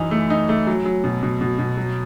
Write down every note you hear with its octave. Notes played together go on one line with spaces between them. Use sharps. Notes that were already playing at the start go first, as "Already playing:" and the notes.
Already playing: F#2 E3 D#4
A3
D#4
A3
F#3
F#3
B2
B2
B2
B2
F#3